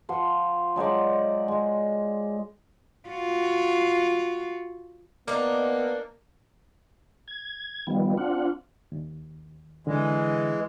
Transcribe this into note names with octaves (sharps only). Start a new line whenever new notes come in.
F3 C5 F#5
F#3 G#3 C5 D5
G#3
F4 F#4
A#3 B3 D4 D#4
G#6
D#3 F3 G3 B3
C4 D4 F4 F#5
D#2
D3 E3 G#3